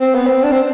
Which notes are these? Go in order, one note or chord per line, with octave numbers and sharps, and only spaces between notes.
C4
B3
C4
D4
C4